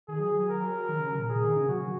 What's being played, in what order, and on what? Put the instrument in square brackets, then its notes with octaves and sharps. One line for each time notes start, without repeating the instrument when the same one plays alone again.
[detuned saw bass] D#3 [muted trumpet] G#4
[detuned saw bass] F#3
F#3
[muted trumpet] A#4
[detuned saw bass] D#3
C#3
C#3
A#2
[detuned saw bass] A#2 [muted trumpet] G#4
[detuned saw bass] D#3
C#3
[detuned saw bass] F#3 [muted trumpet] F#4